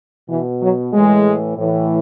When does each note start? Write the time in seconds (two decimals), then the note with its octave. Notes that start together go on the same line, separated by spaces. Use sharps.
0.29 B2 E3
0.61 F#3
0.93 A2 E3 G#3
1.58 A2 E3